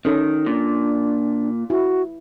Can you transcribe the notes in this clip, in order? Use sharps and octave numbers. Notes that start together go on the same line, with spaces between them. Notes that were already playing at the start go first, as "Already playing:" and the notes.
D#3 C#4 A4
A#2 D4
E4 F#4